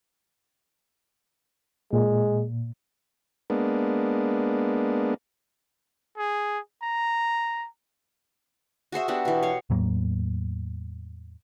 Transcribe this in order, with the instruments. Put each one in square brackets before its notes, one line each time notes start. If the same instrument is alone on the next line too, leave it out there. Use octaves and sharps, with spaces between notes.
[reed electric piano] A#2 [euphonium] G#3
[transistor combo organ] G#3 A#3 B3 D4
[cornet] G#4
A#5
[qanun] F#4 G#4 C5 E5
B3 D4 F#4 G4
B2 E3
C#5 F5
[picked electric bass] E2 A2 F#3 A#3